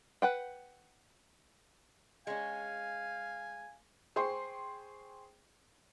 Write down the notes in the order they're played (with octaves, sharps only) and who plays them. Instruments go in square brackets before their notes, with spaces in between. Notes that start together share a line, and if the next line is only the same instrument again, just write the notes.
[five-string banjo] B4 F#5 G5
[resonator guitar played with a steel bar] G#3 C#4 [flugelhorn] F5 [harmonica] G#5
[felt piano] G#4 C5 G5 C6 C#6